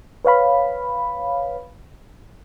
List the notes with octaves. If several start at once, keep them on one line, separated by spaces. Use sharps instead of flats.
B4 C#5 F5 B5